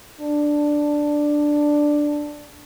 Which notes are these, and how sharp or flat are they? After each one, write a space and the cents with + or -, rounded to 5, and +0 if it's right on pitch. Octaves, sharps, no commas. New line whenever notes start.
D4 +5